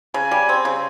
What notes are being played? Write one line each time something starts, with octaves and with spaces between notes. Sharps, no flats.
C#3 G#5
G3
C4
C#3